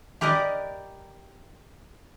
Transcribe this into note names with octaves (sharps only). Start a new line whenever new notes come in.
G4 A#4 B4 D5 D#5